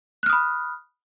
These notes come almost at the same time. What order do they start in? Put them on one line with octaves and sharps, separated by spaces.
F#6 F6 D#6 B5